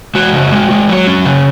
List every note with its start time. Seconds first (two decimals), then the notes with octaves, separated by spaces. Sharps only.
0.15 G#3 F#4
0.33 C#3
0.52 G#3
0.71 G#3
0.89 F#3
1.07 C#4
1.25 C#3